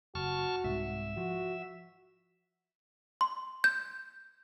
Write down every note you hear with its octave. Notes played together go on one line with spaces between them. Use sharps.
F#1 F#4 A5 C#6 F6
C2 G#2 E5
F3 F#4
C6
G6